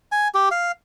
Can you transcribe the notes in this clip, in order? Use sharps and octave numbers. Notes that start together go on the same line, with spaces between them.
G#5
G4
F5